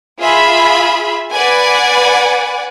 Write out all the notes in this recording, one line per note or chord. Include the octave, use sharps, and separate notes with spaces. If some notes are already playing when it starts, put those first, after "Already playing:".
F4 G#4 E5 B5
B4 D5 F#5 G#5